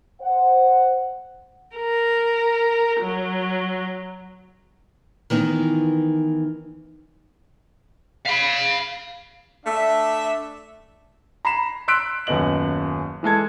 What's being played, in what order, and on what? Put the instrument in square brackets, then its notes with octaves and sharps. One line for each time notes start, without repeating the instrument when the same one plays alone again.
[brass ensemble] C5 F#5
[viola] A#4
F#3
[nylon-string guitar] D#3 E3 B3 D#4
[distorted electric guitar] F5 B5
[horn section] A3 D4 E5
[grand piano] A#5 B5 C7 E7
C6 E6 F#6 B6 D7
D#1 F#2 B3 D#5 F#7
E3 G#3 A4 G#6